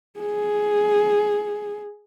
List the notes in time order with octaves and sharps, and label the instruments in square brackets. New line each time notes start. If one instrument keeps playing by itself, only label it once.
[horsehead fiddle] G#4